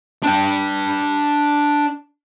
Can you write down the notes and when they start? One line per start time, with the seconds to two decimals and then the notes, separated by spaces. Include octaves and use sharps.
0.23 D4 G5